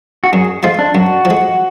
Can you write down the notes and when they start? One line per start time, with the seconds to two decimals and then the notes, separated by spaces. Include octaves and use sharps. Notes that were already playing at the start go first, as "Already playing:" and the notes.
0.24 F#4
0.32 F#2 G#4
0.63 F3 G#3 F4
0.79 D4
0.94 F#2 F#4
1.25 F3
1.30 G#3